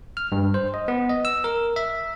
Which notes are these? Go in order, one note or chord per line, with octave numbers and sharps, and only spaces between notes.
F6
G2
C5
D#5
B3
D#5
E6
A#4
E5